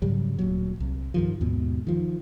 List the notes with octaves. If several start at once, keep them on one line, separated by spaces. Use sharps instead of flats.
G#2 C#3 F#3 G3
D1 A#2 F#3
C2
G2 D#3 F3
D#2 G#2 B2
D#3 F3